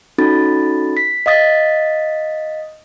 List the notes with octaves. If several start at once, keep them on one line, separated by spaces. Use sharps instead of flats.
C#4 D#4 F#4 A4 B5 A6
B6
D#5 F5 D#6 A6 B6